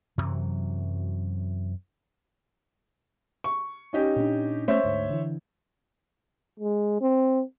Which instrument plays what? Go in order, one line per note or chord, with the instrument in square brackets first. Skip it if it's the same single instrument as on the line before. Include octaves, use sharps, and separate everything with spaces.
[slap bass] F#2 C3 E3 F#3
[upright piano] C#6
C#4 D#4 G4
[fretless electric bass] A#2 D4
[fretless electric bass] A3 B3 C#4 [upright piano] C5 C#5 E5
[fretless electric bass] D2 G#2
D3 E3
[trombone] G#3
C4